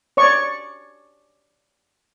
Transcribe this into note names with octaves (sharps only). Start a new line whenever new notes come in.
C#5 D5 C#6